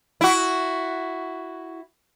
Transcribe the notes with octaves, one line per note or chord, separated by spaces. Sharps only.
E4 F#4